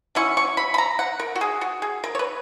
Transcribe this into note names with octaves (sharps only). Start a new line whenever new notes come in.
F#3 C#4 E4 C#6
C#6
B5
B5
A#5
F#5
A#4
F#4
G#4
F#4
G#4
A#4
C#5
B4